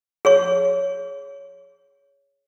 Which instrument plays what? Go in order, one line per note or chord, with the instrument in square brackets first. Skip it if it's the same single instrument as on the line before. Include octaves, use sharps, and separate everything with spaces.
[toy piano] G#4 C#5 C#6